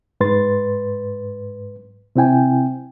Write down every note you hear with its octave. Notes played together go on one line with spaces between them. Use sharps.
G#2 B4 C6 A6
C3 C4 E4 G5 G#5